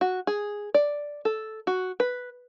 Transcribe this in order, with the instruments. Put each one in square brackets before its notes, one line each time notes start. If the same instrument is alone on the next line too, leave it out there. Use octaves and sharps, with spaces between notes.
[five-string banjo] F#4
G#4
D5
A4
F#4
B4